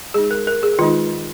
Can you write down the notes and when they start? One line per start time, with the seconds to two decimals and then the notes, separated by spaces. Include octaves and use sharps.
0.14 G#3 D#4 G#4
0.31 A#4
0.47 A#4
0.63 G#4
0.79 D#3 G#3 D#4 F4